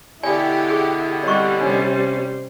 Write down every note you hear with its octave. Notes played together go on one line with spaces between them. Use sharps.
B2 D3 B3 E4 G4 D5 G#5
G#4
G3 C4 D5 D#5 F#5 C#6
C3 G3 C#4 D4 C5